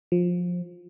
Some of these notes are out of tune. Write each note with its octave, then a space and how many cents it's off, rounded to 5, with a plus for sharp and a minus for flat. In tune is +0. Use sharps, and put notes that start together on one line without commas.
F3 +20